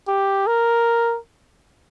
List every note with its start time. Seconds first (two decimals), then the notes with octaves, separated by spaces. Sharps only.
0.08 G4
0.47 A#4